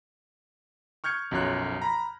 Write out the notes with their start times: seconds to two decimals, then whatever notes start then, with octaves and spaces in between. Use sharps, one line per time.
1.04 C#6 F6 G6 G#6 C#7
1.31 B1 F#2 F3 C#5 F#6
1.82 A#5 B5 A#6